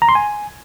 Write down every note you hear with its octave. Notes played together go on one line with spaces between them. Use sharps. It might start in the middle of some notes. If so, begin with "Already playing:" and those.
A#5
C6
G#5